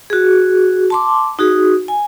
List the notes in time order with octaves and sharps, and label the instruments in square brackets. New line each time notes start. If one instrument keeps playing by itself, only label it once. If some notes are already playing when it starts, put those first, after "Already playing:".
[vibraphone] F#4 G#4
A5 C6 D6
D#4 F#4 G#4
G#5